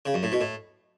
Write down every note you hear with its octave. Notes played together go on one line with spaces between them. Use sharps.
C#3
F#2
A2
B2
A2